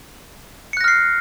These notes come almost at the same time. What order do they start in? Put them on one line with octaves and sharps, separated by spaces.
C#7 F#6 A#6 F6 C7